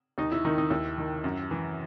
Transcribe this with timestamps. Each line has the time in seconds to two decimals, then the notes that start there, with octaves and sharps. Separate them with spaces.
0.18 D#2 D#4
0.32 E4
0.45 D#3 D#4
0.58 D#4
0.70 D#2 E4
0.98 D#3
1.24 F#2
1.51 E3